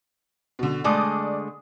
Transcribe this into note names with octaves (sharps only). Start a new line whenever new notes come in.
B2 D3
D3 G#3 A3 D5 D6 D#6